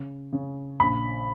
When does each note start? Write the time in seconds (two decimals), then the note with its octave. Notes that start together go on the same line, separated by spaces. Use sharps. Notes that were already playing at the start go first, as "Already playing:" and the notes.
Already playing: C#3
0.33 C#3
0.80 A#1 B5